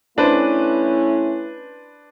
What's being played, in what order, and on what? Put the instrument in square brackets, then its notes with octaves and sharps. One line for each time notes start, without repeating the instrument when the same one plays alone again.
[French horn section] A3 C#4 E4 [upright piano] D4 B4 C5